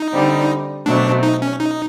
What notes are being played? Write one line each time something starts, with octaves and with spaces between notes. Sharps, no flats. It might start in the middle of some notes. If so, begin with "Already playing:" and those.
Already playing: D#4
D3 G3 C4
B2 F#3 A3 C4 D4
D#4
C#4
D#4